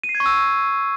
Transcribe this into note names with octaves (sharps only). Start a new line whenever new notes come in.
D#7
C7
G#6
C#6
E6